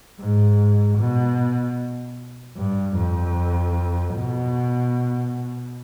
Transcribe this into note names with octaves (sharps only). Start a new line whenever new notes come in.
G#2
B2
G2
F2
B2